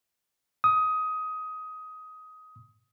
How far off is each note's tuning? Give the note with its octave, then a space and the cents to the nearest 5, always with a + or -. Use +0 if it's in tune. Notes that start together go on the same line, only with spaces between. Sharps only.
D#6 +15